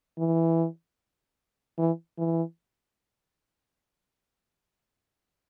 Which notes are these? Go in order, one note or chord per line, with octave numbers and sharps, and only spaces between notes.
E3
E3
E3